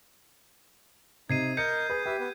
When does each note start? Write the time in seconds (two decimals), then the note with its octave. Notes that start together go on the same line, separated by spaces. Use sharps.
1.29 C3 D#4 G#6 C7 D#7
1.57 A#4 D#5 G6 C#7
1.90 G#4 B4
2.06 G4 B4 E5
2.20 B3 B4